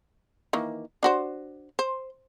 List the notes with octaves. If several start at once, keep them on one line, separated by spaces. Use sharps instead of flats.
D#3 E3 A#3
D4 F#4 C5
C5